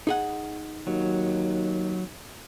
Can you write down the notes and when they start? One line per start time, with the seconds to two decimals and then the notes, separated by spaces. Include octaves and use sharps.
0.07 D#4 G#4 F#5
0.87 D#2 F#3